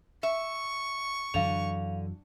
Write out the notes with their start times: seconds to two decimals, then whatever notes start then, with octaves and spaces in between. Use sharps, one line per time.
0.23 E5 C#6
1.34 F#2 D3 E3 F#3 F5 F7